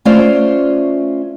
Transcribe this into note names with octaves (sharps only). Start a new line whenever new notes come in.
A3 C#4 F4 C5 D5 F5